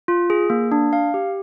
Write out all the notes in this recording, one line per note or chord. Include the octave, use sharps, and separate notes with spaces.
F4
G#4
A#3
D4
F5
G4